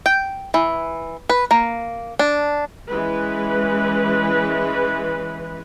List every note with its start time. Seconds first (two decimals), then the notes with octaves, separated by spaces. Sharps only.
0.06 G5
0.54 E3
1.30 B4
1.51 A#3
2.19 D4
2.89 E3 G#3 C#4 B4